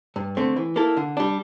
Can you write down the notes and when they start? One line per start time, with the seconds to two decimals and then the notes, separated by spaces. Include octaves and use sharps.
0.16 G2
0.37 D3 A3 C4
0.56 E3
0.76 A#3 E4 A4
0.97 D3
1.17 G3 D4